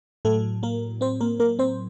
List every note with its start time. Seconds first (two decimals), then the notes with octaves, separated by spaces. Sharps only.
0.25 A2 F#3 A3 A4
0.63 A#3 A#4
1.01 C4 C5
1.20 A#3 A#4
1.40 A#3 A#4
1.59 C4 C5